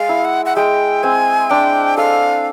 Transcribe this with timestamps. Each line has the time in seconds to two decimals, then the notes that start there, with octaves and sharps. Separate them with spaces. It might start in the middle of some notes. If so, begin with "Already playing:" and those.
Already playing: G#3 F5
0.09 E4
0.25 F#5
0.46 F#5
0.56 G#3 G5
1.03 C4 G#5
1.50 D4 G5
1.97 A4 F5